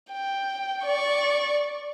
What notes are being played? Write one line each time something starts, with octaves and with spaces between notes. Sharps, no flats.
G5
D5 C#6